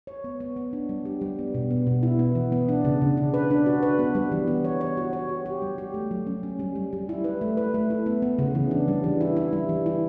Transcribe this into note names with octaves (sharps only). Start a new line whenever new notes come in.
C#5
B3
B3
B3
D4
G3
G4
G3
B3
B2
B3
B2
E4
B3
E3
B3
D4
C#3
C#3
D4
B4
D4
F#4
B4
B3
G3
E3
B3
C#5
C#5
F#4
C#5
G4
G4
G3
G4
A3
F#3
C#4
C#4
G3
G3
G3
E4
B4
A3
B4
A3
E4
B3
B3
C#3
E3
D4
G3
E3
E4
E4
G3
E3
E4